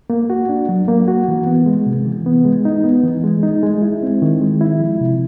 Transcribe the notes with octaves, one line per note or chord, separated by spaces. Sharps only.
A#3
F#4
D4
F#3
A#3
F#4
E3
B3
G#3
C3
E3
B3
G#3
D#4
B3
E3
G#3
D#4
G#3
E4
C4
D#3
G#3
E4
F3
C3